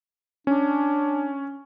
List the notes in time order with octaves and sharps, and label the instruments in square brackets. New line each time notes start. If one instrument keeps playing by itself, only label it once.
[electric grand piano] C#4 [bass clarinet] D4